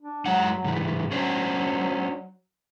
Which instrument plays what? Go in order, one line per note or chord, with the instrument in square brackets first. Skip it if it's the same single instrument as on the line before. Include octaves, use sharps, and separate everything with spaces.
[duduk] D4
[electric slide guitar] F#2 G#3 F#5 [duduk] F#3
[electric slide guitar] G#2 C#3 E3
[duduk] F#3 [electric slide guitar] C#4 D4 C5